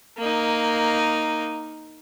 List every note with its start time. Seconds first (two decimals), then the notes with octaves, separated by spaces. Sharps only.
0.18 A#3 D#4